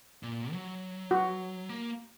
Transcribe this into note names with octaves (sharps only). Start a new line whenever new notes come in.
A#2
F#3
F#4
A#3